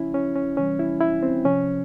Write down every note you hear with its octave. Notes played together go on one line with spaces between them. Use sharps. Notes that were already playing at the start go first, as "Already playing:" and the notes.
Already playing: C#3 F3 C#4 E4
C#4
C#4
C3 E3 G3 C#4
E4
E4
C4
C3 F3 C#4